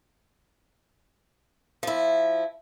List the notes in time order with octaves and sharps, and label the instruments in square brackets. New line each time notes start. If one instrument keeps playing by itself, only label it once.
[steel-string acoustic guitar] F3 E4